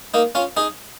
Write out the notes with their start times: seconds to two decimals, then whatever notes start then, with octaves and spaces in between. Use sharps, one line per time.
0.14 A#3 D#4
0.35 C#4 F4
0.57 D#4 G#4